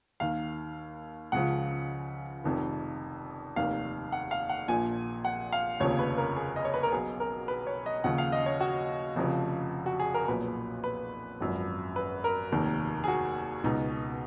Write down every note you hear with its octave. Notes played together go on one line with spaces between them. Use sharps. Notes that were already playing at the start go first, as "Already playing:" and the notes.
D#2 D#3 F5
C#2 C#3 F3 F#5
F1 F2 D#3
F1 D#2 D#3 F5
F#5
F5
F#5
A#1 A#2 F3 G#5
F#5
F5
F1 D#2 C#3 F3 C#5
B4
A#4
G#4
D#5
C#5
B4
A#4
B1 B2 G#4
A#4
B4
C#5
D#5
D#2 C#3 F3 F#5
F5
D#5
C#5
F#4
F1 F2 C#3 F3
F#4
G#4
A#4
B1 A#2 F3 B4
B4
G#1 F#2 F3
B4
A#4
F1 D#2 D#3
G#4
F#4
C#2 B2 D#4